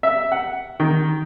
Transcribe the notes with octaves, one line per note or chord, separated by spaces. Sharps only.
E5
F#5
D#3